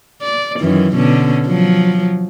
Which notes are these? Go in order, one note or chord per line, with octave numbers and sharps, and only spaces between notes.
D5
F#2 D#3 E3
B2 D3 C#4
F3 F#3